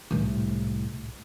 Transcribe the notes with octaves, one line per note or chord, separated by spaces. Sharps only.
C2 A2